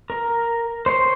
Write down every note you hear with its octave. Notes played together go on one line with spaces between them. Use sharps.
A#4
C5 C#5 C6